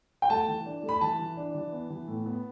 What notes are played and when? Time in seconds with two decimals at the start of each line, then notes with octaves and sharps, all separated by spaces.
0.22 G5
0.30 A3 A5
0.48 E3
0.66 D4
0.83 A3
0.89 B5
1.01 E3 A5
1.19 E3
1.37 D4
1.55 E3
1.72 B3
1.90 E3
2.08 A2
2.26 B3